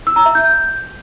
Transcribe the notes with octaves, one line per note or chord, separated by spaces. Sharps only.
E6
A#5
E5
G6